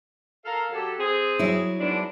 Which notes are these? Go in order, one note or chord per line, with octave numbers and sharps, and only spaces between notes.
A4 A#4 F5
F#3 G4 A4
C4 G#4
F#3 E4
G#2 B3 D4